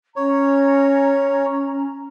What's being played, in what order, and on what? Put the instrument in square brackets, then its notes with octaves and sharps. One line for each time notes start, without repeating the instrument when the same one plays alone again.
[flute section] C#4 A#5 [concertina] C#5